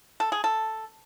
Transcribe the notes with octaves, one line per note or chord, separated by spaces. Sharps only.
A4
G#4
A4